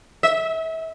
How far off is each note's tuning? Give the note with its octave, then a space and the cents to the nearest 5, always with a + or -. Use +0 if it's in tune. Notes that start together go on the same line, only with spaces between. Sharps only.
E5 -30